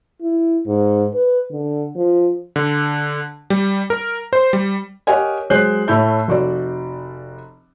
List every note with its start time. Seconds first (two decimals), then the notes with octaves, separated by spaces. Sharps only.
0.22 E4
0.66 G#2
1.15 B4
1.51 D3
1.96 F3
2.56 D3
3.50 G3
3.90 A#4
4.33 C5
4.53 G3
5.07 G4 A#4 C#5 D#5 F#5 G#5
5.50 F#3 G#3 C5 F#6 G6 C7
5.88 A2 A3 E4 C#5 E5 G6
6.28 F1 F#4 D5